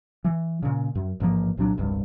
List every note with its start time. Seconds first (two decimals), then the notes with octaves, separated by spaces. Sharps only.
0.24 E3
0.62 A#2 C#3
0.95 F#2
1.20 A1 G#2 F3 A#3
1.57 C2 A#2 F#3 D4
1.78 E1 C2 G2 D#3